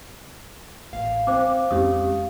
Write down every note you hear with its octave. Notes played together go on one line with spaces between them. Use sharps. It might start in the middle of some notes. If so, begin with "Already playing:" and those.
A1 F5
C4 C5 G5 D6
F2 G#3 C4 C#4 G4 D#6